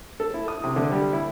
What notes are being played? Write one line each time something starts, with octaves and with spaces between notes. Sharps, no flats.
A4
E4
D#6
C3
D3
G3
E4